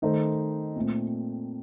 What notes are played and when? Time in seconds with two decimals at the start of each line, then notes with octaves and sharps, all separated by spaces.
0.02 D#3 A3 D#4 A4 C5
0.76 A#2 A3 C4